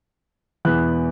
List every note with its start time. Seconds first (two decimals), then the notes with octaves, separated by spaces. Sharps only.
0.65 E1 E2 E3 B3 F#6